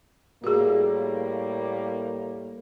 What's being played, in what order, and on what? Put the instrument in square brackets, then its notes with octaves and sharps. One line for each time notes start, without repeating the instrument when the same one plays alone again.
[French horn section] A2 G3 A#3 [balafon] F#4 G#4